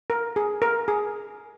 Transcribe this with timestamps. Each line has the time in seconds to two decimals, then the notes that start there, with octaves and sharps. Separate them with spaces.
0.10 A#4
0.36 G#4
0.62 A#4
0.88 G#4